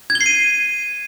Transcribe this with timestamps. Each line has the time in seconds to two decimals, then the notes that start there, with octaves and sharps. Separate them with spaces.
0.10 G#6
0.15 G7
0.21 C7
0.26 D#7